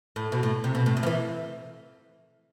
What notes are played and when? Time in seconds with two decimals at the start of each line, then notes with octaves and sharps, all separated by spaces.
0.16 A2
0.32 B2
0.43 A2
0.64 C3
0.75 B2
0.86 A2
0.97 A2
1.03 F3
1.07 E3